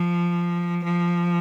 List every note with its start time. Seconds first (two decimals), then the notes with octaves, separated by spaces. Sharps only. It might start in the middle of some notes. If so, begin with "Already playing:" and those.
Already playing: F3
0.84 F3